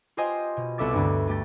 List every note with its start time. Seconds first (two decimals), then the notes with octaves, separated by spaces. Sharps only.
0.17 F4 G4 C5 D#5 G#5 D#6
0.57 B2
0.78 C2 B3 A4 E5 D6 A6
0.93 D2 G2
1.28 A3 G4 A6